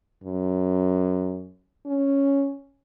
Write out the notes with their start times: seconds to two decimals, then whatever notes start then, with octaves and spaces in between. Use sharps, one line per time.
0.23 F#2
1.86 C#4